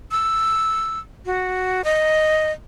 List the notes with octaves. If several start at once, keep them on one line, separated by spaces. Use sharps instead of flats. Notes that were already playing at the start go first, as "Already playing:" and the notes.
E6
F#4
D#5